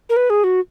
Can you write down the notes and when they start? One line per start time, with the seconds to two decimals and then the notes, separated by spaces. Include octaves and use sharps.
0.09 A#4
0.16 B4
0.30 G#4
0.44 F#4